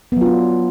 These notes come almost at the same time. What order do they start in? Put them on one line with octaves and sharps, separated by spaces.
B3 F#3 F4 D4